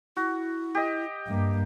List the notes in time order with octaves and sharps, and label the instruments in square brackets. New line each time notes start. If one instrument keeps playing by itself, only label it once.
[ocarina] E4 [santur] F#4
[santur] G4 D#5
[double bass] G2 A#3